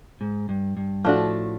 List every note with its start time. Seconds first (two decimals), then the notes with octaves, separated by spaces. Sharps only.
0.21 G#2
0.49 G2
0.77 G2
1.05 A2 F3 A3 D4 F#4